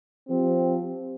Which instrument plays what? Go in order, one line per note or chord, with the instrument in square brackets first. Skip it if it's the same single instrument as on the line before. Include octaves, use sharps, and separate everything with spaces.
[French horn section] F3 C4 G4